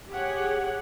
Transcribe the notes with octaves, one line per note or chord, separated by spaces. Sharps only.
G4 G#4 C#5 F#5